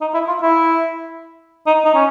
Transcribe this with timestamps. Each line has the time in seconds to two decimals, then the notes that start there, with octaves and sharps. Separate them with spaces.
0.01 D#4
0.14 E4
0.28 F4
0.42 E4
1.67 D#4
1.85 D#4
1.95 C#4